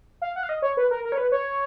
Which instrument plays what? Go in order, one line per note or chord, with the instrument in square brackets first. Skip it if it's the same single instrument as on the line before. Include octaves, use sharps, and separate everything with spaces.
[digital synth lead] F5
F#5
F5
D#5
C#5
B4
A#4
A#4
C#5
B4
C#5